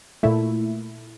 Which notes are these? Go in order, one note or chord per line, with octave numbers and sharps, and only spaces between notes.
A#2 A3 E4